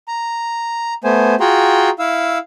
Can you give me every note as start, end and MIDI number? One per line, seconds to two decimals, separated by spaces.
0.08 0.94 82
1.04 1.35 57
1.04 1.35 59
1.04 1.35 72
1.04 1.35 80
1.40 1.90 65
1.40 1.90 66
1.40 1.90 68
1.40 1.90 79
1.40 1.90 82
1.40 1.90 84
1.99 2.38 64
1.99 2.38 77
1.99 2.38 88